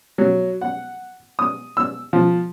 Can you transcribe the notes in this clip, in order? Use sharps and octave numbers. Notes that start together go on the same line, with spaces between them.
F#3
F#5
D#6
E6
F3